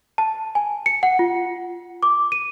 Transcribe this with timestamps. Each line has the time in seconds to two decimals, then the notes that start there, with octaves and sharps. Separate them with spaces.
0.18 A5
0.55 G#5
0.86 C#7
1.03 F#5
1.19 F4
2.03 D6
2.32 D#7